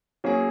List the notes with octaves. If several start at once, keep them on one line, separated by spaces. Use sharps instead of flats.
F#3 A#3 C#4 G#4